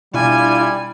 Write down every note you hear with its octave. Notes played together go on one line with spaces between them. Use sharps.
B2 G3 D4 E4 F4 G#5